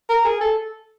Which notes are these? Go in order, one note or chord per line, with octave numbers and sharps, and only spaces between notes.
A#4
G#4
A4